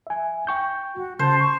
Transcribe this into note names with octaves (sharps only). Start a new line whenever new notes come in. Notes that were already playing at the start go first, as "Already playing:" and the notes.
E5 G#5
G5 C#6 G6
F#4
C#3 C5 A5
C#6